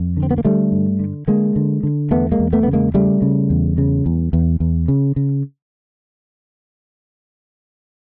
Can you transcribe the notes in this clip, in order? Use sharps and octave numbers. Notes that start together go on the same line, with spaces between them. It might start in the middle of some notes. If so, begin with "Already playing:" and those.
Already playing: F2
D3
C4
B3
A#3
D3 G3 A3
G2
D3
D3 G#3 A#3
D3
D3
E2 A3 B3
G#3 A#3
E2
A3 B3
C#3 B3
G#3 A#3
C#3 G3 A3
C#3
E2
C#3
E2
E2
E2
C#3
C#3